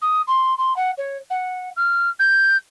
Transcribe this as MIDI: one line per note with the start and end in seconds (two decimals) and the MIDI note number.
0.02 0.22 87
0.27 0.56 84
0.58 0.75 84
0.76 0.91 78
0.98 1.18 73
1.30 1.70 78
1.77 2.09 89
2.19 2.57 91